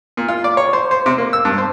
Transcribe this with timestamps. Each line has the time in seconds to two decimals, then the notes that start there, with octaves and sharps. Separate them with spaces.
0.17 A#2
0.29 F4
0.44 D5
0.57 C#5
0.73 C5
0.91 C5
1.06 C3
1.18 A#3
1.33 E6
1.45 G2
1.58 C5